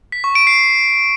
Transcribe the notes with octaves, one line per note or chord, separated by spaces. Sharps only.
B6
C#6
D7
C7